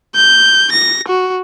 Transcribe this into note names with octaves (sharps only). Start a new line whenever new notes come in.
G6
A#6
F#4